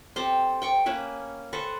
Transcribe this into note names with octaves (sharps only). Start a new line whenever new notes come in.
C4 G4 A4 C5
G5 C#6 D6
A#3 C#4 B4 E5
A4 B4 C5 C#6